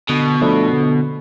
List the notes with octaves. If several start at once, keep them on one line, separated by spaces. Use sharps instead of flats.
B2 D3
F3 A3 D4 A4
D3